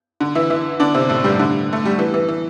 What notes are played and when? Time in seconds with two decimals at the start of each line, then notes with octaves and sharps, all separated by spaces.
0.20 D3
0.35 E3 E4
0.50 E3 E4
0.80 D3 D4
0.94 C3 C4
1.09 A2 A3
1.24 G2 G3
1.39 D3
1.73 A3
1.85 G3
1.99 E3
2.14 E3
2.28 E3